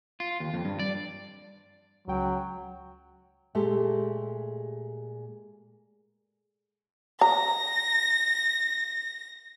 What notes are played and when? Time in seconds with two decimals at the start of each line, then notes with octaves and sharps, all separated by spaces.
0.20 F4
0.40 D#2
0.54 F2
0.65 G2
0.79 D5
2.07 C#2 F#3 G5
3.55 A#2 G#3 A3 G4 A4
7.21 A#5 A#6